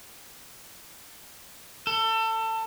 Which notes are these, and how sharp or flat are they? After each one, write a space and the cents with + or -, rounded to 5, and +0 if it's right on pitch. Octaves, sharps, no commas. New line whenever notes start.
A4 +25